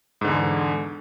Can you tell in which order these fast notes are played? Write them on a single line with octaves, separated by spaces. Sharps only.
G#2 D3 E2